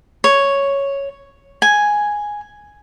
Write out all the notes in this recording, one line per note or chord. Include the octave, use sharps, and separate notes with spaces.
C#5
G#5